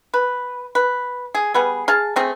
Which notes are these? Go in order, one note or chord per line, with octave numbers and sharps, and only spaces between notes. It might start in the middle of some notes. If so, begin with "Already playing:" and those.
B4
B4
G#4
G3 B3 G#4
G#4 F5 A5
A3 C4 G#4